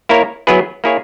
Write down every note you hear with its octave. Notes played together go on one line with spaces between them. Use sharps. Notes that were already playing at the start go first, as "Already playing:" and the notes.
A#3 E4 A#4 C#5
F#3 B3 E4 G#4 B4
A#3 E4 G#4 C#5